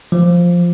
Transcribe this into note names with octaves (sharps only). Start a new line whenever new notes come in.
F3